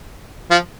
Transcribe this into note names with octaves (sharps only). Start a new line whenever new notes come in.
F3